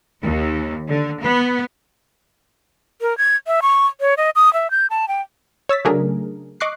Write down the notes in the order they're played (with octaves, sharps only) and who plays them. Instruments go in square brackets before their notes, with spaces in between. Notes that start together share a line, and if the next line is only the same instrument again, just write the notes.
[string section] D#2
D3
B3
[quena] A#4
G#6
E5
C#6
C#5
D#5
D#6
E5
G6
A5
G5
[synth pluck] C#5 E6 A6 B6
C#3 F#3 A3 D4 G#4 A#4
D#5 C#6 D6 F#6 C7